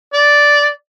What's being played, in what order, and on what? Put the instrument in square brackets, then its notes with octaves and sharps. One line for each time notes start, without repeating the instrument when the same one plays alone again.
[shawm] D5